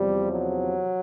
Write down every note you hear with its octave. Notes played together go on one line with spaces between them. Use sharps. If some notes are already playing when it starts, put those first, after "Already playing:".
Already playing: E2 C3 F3 G3
F#3